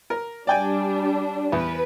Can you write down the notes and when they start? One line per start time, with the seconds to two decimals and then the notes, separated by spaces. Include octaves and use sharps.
0.10 A#4
0.47 G3 D4 D5 G5 G#5
1.52 E2 B4